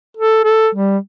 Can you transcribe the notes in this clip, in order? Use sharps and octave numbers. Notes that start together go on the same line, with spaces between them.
A4
A4
G3